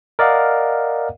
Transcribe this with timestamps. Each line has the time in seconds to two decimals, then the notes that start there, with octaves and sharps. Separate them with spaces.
0.19 A#4 D5 D#5 F5 F#5